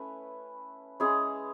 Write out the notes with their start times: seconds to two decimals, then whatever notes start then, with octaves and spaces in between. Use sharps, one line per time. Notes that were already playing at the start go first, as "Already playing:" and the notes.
Already playing: A3 C#4 E4 B4
1.00 G#3 C#4 E4 G#4